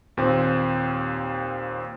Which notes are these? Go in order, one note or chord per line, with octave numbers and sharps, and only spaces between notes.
D#2 A#2 C4